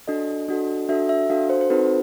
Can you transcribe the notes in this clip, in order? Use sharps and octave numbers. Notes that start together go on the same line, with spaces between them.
D4 F#4 A4 D#5
D4 F#4 A4
D4 F#4 A4 E5
E5
D4 F#4 A4 F5
C5
C5
C4 D#4 F#4 A4 B4